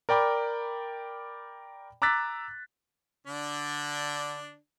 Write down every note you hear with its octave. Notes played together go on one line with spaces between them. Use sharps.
A#4 D5 G5 B5 D6
A#5 D6 E6 F#6 A6 B6
D3 D4